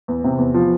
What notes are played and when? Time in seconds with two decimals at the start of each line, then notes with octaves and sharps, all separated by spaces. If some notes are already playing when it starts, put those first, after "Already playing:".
0.08 E2
0.24 C3
0.38 E2
0.54 F3